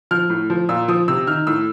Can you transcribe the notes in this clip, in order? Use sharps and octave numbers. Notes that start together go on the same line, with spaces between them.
F3 F6
A2
F3
A#2 E6
F3 D#6
C3 E6
D#3 F6
A2 E6